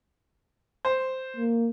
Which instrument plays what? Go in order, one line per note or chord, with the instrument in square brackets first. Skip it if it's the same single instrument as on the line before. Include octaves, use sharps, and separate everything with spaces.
[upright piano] C5
[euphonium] A#3